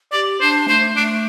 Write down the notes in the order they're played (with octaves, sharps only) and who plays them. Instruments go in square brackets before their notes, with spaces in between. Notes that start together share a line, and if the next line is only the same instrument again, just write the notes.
[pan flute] G4 [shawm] D5
[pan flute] D4 [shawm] C5
[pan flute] A3 [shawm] C5
[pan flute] A3 [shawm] D4